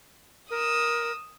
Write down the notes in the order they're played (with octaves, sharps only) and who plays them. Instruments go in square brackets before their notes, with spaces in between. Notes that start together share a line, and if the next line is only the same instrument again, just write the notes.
[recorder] A#4 [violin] D#6 E6